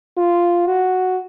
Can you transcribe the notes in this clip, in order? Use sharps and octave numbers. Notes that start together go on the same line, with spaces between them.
F4
F#4